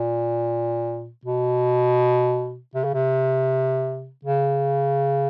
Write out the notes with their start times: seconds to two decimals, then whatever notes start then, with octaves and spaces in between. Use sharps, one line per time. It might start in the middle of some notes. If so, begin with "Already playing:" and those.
Already playing: A#2
1.25 B2
2.75 C3
2.84 C#3
2.94 C3
4.25 C#3